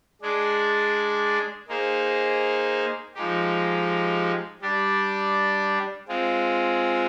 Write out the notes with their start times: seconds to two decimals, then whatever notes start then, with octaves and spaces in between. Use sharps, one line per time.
0.22 G#3 D4 G#4 D5
1.68 A#3 D#4 G#4 C5
3.15 F3 G#3 D#4 G4
4.61 G3 D4 G4 D5
6.08 G#3 C4 F4 G#4